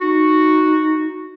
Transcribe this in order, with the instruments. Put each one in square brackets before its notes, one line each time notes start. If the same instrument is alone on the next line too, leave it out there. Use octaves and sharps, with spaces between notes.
[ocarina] D#4 [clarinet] F#4